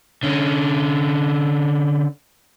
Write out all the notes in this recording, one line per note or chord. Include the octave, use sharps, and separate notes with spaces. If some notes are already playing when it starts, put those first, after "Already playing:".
D3 C#4